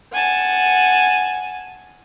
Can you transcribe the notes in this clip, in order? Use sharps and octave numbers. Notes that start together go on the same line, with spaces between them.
F#5 G#5 A5